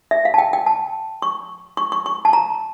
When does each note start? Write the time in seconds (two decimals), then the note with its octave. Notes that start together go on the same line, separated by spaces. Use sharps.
0.11 E5
0.25 F5
0.34 A5
0.38 G5
0.53 G5
0.66 A5
1.22 C#6
1.77 C#6
1.92 C#6
2.06 C#6
2.25 A5
2.33 A#5